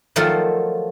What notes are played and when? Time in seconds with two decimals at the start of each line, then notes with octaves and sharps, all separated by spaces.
0.16 D#3 F3 F#3 A3 F4 A4